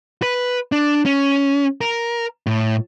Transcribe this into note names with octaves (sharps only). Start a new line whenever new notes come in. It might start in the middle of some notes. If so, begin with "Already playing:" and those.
B4
D4
C#4
A#4
A2